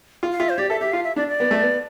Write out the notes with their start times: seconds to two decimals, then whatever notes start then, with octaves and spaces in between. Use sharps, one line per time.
0.23 F4
0.32 F5
0.40 F4 E5
0.49 C5
0.58 G4 D5
0.70 A4 E5
0.81 G4 E5
0.92 F4 F5
1.04 E5
1.16 D4 D5
1.28 D5
1.40 B3
1.51 A3
1.62 B3